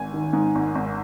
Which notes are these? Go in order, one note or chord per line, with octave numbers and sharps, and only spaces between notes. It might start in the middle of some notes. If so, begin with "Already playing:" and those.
Already playing: G#1 G#5
D#3
G#2
G#1
G#1